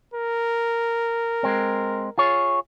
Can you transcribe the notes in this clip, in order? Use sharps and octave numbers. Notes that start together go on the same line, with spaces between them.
A#4
G#3 C4
F4 G#4 C#5